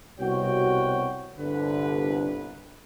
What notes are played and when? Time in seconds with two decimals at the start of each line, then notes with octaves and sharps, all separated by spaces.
0.20 C2 B2 C4 F#4 C#5 G5
1.39 G1 C2 D3 B4